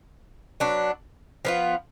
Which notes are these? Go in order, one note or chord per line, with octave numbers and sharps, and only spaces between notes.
F#3 B3 D4
F3 B3 F4